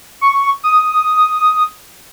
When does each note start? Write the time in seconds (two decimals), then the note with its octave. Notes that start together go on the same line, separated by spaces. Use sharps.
0.21 C#6
0.64 D#6